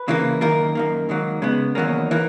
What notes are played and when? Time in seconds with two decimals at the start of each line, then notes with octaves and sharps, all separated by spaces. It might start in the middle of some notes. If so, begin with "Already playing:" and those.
Already playing: B4
0.08 C#3 E3 A#3
0.41 F#2 D#3 A#3 A#4
0.75 F#2 D#3 A#3
1.09 G#2 D#3 F#3 A#3
1.42 C#3 G#3 B3
1.75 E2 D#3 F#3 A#3 C#4
2.11 E3 A#3